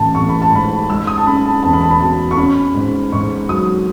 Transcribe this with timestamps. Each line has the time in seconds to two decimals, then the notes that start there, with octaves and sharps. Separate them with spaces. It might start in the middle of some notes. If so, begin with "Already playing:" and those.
Already playing: A1 E3 A5
0.15 A1 C#6
0.29 B5
0.42 A5
0.52 G#2 B5
0.90 G#3 E6
1.07 D#6
1.18 A5
1.27 C#4 B5
1.46 A5
1.63 E2 A5
1.73 B5
1.81 A5
1.91 B5
2.00 B2 A5
2.31 C#6
2.37 C#4 B5
2.74 G#2
3.12 G#2 C#6
3.49 F#3 D#6